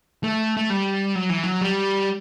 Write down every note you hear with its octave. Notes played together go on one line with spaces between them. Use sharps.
A3
A3
G3
F#3
E3
F#3
G3